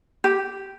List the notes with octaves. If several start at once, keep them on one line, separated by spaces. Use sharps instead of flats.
G4